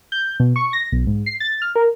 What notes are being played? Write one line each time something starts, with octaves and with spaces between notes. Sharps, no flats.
G6
B2
C#6
A#6
B1
G#2
C7
A6
F6
A#4